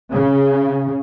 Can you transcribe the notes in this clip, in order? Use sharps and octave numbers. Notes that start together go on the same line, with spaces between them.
C#3